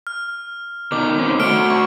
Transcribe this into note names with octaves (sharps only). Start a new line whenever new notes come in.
F6
B2 D#3 D#4 D6
D#3 C4 C#4
A3 F#4 F6 D7 G7
C#6